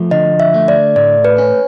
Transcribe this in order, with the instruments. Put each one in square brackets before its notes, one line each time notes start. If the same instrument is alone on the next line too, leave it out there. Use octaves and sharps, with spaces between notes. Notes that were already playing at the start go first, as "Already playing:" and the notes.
Already playing: [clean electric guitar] F3 A3
[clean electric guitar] D3 [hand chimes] D#5
[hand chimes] E5
[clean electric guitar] A3
[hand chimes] D5
[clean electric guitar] A2 [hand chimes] D5
[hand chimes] B4
[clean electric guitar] C#4